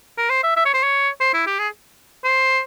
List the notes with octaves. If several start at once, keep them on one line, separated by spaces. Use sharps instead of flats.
A#4
C5
E5
E5
C#5
C5
C#5
C5
E4
G4
G#4
C5